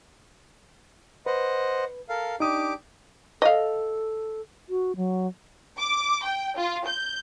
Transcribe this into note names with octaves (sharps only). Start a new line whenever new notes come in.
B4 C5 D#5 F#5
A4 A#4 F5
D4 D#4 G4 D6 D#6
A4 D#5 F5
F#4
F#3
D6
G5
F4
G6